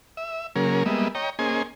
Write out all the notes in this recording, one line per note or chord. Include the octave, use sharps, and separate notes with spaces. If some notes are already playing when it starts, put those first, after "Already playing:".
E5
C#3 F#3 A#3 C#4 G#4 A#4
G3 G#3 A#3 B3 D#5 E5
C#5 D#5 G5 A#5
A#3 C#4 G#4 C5 D#5 G#5